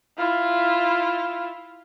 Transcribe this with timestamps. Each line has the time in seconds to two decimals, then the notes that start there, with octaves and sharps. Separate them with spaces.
0.18 E4 F4